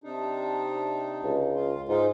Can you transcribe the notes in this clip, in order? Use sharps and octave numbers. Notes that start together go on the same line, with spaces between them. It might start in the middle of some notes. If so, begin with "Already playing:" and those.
C3 D4 D#4
C#2
F4
G#2 D#4 F4